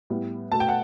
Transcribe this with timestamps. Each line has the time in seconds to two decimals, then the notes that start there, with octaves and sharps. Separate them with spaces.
0.10 A2 G3 B3
0.52 B2 A3 A5
0.60 G5
0.69 F#5